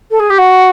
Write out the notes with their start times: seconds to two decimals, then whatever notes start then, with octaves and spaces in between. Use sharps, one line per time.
0.10 A4
0.19 G#4
0.29 G4
0.38 F#4